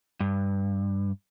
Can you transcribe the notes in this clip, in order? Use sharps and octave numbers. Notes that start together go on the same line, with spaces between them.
G2